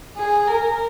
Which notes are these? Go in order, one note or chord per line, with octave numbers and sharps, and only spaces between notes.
G#4
A#4